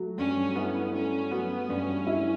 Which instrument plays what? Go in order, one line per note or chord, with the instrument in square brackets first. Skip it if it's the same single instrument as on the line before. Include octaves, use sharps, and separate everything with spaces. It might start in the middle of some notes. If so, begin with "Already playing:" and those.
Already playing: [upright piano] F#3 A3
[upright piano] G2 [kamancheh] C#4
[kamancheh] B3 [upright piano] E4
[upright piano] A3 [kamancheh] C#4
[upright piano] F#3 [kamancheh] B3
[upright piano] G2 [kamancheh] C#4
[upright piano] E4